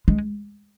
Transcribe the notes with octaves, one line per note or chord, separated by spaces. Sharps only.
G#3